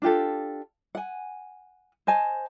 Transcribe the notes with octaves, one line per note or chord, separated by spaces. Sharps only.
D4 F4 G4 A4
F#5 G#5
C5 D#5 G#5 A5